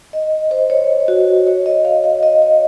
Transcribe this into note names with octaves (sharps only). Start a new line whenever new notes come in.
D#5
C5
C#5
F#4
C#5
D#5
F5
F5
D#5
C#5